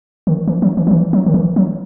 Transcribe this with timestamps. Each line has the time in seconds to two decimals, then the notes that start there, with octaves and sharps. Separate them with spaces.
0.27 D#3
0.47 E3
0.62 F#3
0.77 E3
0.87 F#3
0.91 E3
1.13 F#3
1.26 D#3
1.34 E3
1.56 F#3